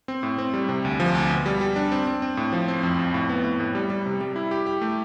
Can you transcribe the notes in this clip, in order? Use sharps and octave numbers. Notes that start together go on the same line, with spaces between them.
C4
A2
C4
G3
C3
D2
F3
D2
B2
G3
G3
D4
C4
C4
C4
A2
F3
C4
F2
F2
A2
B3
A2
A2
G3
G3
C3
G3
E4
G4
G4
A3